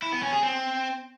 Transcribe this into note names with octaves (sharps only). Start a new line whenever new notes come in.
E4
B3
C#4
G#4
C4